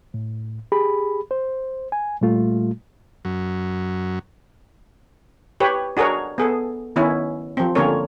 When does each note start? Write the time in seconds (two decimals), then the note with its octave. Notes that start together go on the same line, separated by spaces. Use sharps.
0.14 A2
0.72 G4 G#4 B5
1.31 C5
1.92 G#5
2.21 A#2 G3 A3 F4
3.25 F#2
5.60 G4 B4 C#5
5.97 D4 F#4 G#4 A#4 C#5
6.38 B3 G#4 A4
6.96 D#3 B3 C#4 E4
7.57 F3 C4
7.75 D3 A#3 C4 C#4 A#4 C#5